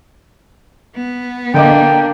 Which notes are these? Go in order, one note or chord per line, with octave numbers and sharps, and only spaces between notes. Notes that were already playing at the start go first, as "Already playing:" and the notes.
B3
D3 A#3 D4 D#5 G5 D6